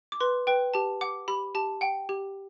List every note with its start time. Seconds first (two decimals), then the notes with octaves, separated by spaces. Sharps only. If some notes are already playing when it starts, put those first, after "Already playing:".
0.12 D6
0.20 B4 C6
0.47 B4 G5
0.74 G4 A5
1.01 F#5 D6
1.28 G4 B5
1.55 G4 A5
1.81 F#5 G5
2.09 G4